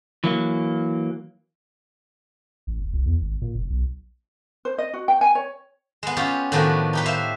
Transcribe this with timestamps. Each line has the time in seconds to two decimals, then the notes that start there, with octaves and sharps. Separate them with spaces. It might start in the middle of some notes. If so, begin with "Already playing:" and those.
0.24 E3 F#3 A#3
2.67 A1
2.80 D#1
2.93 C2
3.06 E2
3.21 G#1
3.41 A#2
3.55 F#1
3.70 B1
4.65 C5
4.78 D#5
4.94 F#4
5.08 G5
5.21 G#5
5.35 C#5
6.03 G#3 B3
6.17 C#4 F4 G4
6.52 A2 D#3 F3 B3 D4 F#4
6.93 D#4 G4 B4
7.06 C5 E5 F5